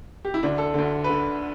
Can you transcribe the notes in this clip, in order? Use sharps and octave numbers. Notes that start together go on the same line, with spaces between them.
G4
E4
D2 D3 D4
A4
D2 D3
B4
D3